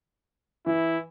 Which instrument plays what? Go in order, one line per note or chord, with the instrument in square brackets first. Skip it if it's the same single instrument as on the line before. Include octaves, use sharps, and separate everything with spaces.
[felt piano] E3 [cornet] E4